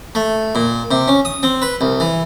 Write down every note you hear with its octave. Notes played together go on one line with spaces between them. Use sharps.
A3
A#2
C3
C#4
D#6
C4
B4
C2
E3